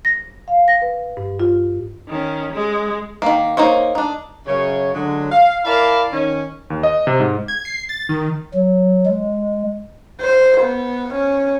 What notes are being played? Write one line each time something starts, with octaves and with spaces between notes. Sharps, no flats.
A#6
F5
A#6
B4
G2
F4
D#3 C#4
G#3
D#3 A#3
A#3 D#4 C5 C#5
D4 D#4
F#2 C#3 C#5
D3 F#3 G#3
F5
E4 A#4 D5 F5 A5 B5
D#3 C#4
D#2
D#5
C3
G#2
G#6
C7
A6
D#3
F#3
G#3
C5
B3
C#4